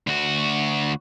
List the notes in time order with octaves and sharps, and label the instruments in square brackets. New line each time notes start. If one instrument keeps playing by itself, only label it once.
[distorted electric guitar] D2 F#4